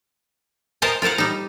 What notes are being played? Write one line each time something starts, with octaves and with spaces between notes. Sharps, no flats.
B3 A#4 C5 D#5 G5 A5
F4 A#4 C5 F5 F#5
G3 D#4